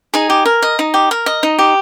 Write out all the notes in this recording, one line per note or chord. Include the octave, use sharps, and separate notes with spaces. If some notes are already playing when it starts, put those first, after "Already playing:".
D#4 G#4 G#5
G4
A#4
D#5
D#4
G4
A#4
D#5
D#4
G4